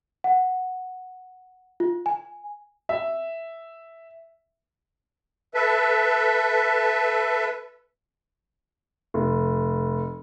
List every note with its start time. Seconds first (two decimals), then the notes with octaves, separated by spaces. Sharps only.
0.24 F#5
1.80 F4
2.06 G#5
2.89 E5
5.54 A4 B4 E5
9.14 F1